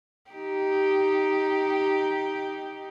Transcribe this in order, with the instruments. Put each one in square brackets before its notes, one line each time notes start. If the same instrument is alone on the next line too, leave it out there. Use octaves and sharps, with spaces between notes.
[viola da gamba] D#4 G4